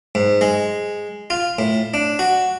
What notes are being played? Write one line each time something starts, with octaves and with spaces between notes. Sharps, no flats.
G#2
G#3
F4
A2
D4
F#4